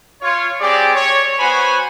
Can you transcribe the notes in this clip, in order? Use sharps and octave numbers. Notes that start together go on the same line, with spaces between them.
F4 C#5
G3 C4 G4 G#4 D5
C#5
B3 F#4 C5 C#5 G#5 B5